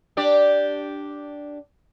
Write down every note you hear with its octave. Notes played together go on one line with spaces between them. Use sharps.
D4 G4 D5